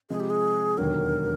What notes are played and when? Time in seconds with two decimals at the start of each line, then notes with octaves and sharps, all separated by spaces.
0.10 C3 F3 G#3 G#4
0.20 G4
0.30 G#4
0.77 E1 D#2 D3 F#3 A#4